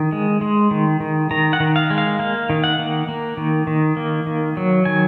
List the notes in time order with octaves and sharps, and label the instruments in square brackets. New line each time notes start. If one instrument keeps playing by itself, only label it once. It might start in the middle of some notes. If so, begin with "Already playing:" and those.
Already playing: [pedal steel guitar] D#3
G#3
G#3
D#3
D#3
D#3 A#5
F#5
D#3
F5
G#3
F5
A#3 F5
D#3
F#5
A#3
A#3
D#3
D#3
A#3
D#3
F#3
D#3 G#5